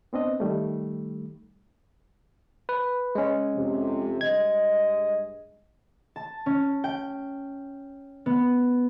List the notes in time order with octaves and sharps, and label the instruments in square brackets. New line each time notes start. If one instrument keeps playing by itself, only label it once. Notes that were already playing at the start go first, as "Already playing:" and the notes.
[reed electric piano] B3 C4 D4 D#5
D#3 G3 A3
[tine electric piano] B4
G#3 C#4
[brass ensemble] F2 C3
[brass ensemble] G2 G#3 D#5 [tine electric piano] G#6
[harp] A5
C#4
G5
B3